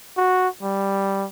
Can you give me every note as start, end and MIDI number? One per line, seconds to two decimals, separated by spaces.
0.17 0.49 66
0.63 1.27 55